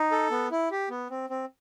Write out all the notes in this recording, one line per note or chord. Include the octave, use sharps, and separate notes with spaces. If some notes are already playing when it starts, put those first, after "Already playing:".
Already playing: D#4
A4
B3
E4
G4
B3
C4
C4